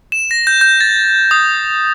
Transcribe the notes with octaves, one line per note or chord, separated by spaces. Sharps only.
E7
A#6
G6
G6
A6
D#6